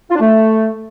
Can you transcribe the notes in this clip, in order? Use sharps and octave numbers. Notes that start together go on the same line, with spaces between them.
F4
D4
A3